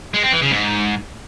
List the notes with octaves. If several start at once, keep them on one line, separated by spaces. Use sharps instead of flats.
G#3
C4
E3
C#3
G#2